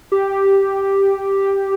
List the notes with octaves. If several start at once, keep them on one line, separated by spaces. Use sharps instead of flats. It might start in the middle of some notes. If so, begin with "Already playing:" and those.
G4